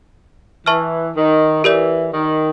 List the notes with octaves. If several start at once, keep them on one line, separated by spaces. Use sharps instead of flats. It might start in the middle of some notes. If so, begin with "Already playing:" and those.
E3 B4 E5 A5 C#6 F6
D#3
E3 G4 A#4 D5
D#3